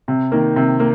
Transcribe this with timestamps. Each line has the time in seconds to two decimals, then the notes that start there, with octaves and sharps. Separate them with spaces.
0.08 C3
0.32 D#3 A#3
0.56 C3
0.80 A#3